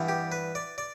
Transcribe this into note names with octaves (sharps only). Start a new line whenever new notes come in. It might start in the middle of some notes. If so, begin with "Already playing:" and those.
Already playing: G2 E3 G3 B3
G4
B4
D5
D5